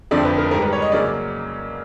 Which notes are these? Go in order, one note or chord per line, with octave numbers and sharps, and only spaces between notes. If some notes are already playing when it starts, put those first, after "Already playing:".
F2 D3 F3 A3 C4 D5
B4
A#4
G#2 D#3 G3 A#4
B4
C#5
D#5
C#3 F#3 A#3 C#4 D5